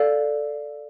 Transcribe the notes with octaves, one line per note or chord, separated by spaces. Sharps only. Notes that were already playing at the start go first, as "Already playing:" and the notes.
Already playing: A4 D5 F5